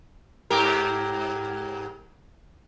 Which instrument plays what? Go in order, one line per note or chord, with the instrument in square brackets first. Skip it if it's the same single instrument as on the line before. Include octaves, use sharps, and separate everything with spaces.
[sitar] G#2 G4 A#4